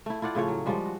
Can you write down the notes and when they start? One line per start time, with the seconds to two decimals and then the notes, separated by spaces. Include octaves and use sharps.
0.06 A3 E4
0.22 E4 F4 D5 F#5
0.35 A2 C#3 F3 C#5
0.48 F#3
0.66 F3 G3 G#3
0.86 F#4